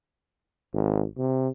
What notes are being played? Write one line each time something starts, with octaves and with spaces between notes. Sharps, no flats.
G#1
C3